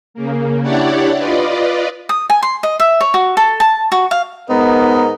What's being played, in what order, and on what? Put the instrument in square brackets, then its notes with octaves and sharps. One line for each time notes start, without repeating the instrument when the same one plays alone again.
[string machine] C#3 A#3
D4 E4 G4 C#5 D5 F#5
F4 B4 D5 D#5
[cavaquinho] D#6
G#5
C6
D#5
E5
C#5
F#4
A4
A5
F#4
F5
[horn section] G#2 D#4 A#4 [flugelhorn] B3